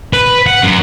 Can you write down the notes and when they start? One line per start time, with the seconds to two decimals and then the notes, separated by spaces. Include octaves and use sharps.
0.13 B4
0.46 F#5
0.63 F#2